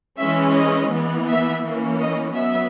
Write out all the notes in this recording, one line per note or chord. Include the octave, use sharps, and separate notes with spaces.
E3 G#3 C#4 E5
D#5
E3 B3
E5
E3 A#3 C#4
D#5
F#3 B3 E5